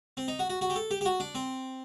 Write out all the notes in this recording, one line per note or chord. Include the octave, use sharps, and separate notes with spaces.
C4
D#4
F#4
F#4
F#4
G4
A4
G4
G4
F#4
D4
C4